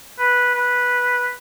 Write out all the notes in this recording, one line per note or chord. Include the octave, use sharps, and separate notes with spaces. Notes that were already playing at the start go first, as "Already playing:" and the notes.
B4
B4